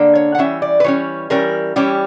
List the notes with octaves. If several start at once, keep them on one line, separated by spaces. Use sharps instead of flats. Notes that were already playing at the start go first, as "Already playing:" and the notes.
Already playing: D3 A#3 D4
C#5
F#5
E3 G3 C#4 E5
D5
B4
E3 G3 C#4 C#5
E3 G3 C#4 A#4
E3 G3 C#4 G4